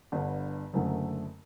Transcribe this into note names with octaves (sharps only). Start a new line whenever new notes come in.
G1 G2 D3
F#1 F#2 D3 A3